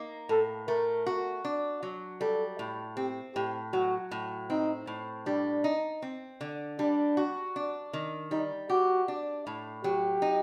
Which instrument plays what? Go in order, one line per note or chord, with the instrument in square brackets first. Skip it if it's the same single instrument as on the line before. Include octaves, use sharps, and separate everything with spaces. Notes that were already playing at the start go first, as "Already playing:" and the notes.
Already playing: [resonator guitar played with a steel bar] A#3 D#4
[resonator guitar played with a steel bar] A2 [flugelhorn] A4
[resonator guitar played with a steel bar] A3 [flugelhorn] A#4
[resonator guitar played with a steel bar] F#4
D4
F#3
[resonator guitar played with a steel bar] G3 [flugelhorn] A4
[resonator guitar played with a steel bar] A2
[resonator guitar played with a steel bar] C4 [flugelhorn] G4
[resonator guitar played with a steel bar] A2 [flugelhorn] G4
[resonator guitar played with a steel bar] F#3 [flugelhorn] F#4
[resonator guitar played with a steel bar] A2
[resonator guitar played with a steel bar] C4 [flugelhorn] D#4
[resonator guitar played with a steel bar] A2
[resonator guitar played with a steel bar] G3 [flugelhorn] D4
[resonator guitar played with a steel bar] D#4
C4
D3
[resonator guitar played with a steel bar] G3 [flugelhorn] D4
[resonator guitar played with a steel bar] F#4
D4
D#3
[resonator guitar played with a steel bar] G3 [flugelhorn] D#4
[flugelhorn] F#4 [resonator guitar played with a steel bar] G4
[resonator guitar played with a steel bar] D4
A2
[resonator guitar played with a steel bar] F#3 [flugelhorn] G4
[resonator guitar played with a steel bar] D#4